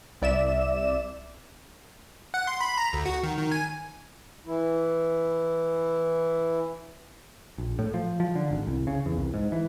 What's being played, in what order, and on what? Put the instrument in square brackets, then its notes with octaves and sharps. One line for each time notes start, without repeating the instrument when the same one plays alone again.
[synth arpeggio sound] C2 D5 E5 E7
[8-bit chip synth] F#5
C6
B5
A#5
D2
F#4
D#3
D#3
G#5
[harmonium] E3 E4
[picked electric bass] A#1
A2
F3
F3
D3
G#1
C2
C#3
E2
C2
G#2
E3